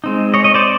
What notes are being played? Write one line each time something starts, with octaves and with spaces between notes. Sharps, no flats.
G#3 C4 D#4
C#5 D#5
C#5 D#5
C5 D5